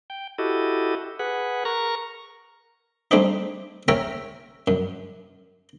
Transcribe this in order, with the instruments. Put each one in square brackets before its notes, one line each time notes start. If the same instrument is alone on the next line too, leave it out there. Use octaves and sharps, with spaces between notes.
[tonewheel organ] G5
E4 F#4 G4 A4 D#5
G#4 B4 F#5
A#4 A#5 C#6
[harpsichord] G3 A3 C4 D4 D#4
C#4 A#4 C#5 E5 G5 A#5
F#2